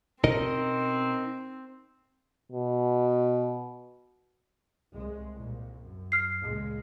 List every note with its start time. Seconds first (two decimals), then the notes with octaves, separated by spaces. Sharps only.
0.24 B2 C4 C#4 D#4 A#4 D#5
2.52 B2
4.93 C2 G#3
5.34 C2 A#2
5.80 F#2
6.12 F6 C7
6.43 C#2 A#2 G#3